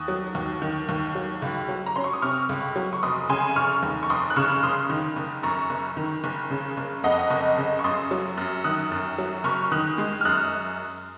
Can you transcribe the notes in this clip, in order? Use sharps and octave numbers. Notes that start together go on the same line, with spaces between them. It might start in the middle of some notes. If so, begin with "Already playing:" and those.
Already playing: D#2 D#6 F#6
F#3
D#2
D#3
D#2
F#3
C#2
F#3
A#5
C#4 C6
C#6
D#6
C3 C#6 F6
C#2
F#3
C#6
F1 C6 D#6
C#3 G#5 C6
F1 C#6 F6
D#2
C#6
F1 C6 D#6
F#6
C#3 C#6 F6
F6
F#1 C6 D#6
D#3
F#1
F#2 A#5 C#6
F#1
D#3
F#1
C#3
F#1
F2 D#5 F#5
F#1
C#3
C#6
F#2 C6 D#6
F#3
F#2
D#3 D#6 F#6
F#2
F#3
F#1 C#6 F6
D#3 D#6 F#6
G#3
F6
F#2 D#6 F#6